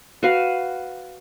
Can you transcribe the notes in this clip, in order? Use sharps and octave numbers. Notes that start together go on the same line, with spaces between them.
F#4 B4 F5